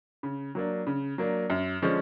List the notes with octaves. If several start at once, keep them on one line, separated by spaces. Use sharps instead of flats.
C#3
F#3 A#3 D4
C#3
F#3 A#3 D4
F#2
D3 F3 G#3 C#4